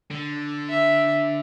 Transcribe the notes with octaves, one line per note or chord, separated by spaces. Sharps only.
D3
E5